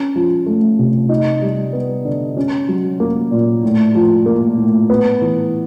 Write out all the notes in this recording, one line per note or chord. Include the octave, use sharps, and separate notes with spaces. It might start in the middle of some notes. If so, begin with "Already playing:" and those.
Already playing: C#4
F3
A3
C3
D#4
G3
B3
D3
C#4
F#3
A#3
A#2
A2
F3
A#3
A2
B3
E3